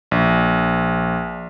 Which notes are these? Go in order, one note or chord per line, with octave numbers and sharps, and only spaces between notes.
A#1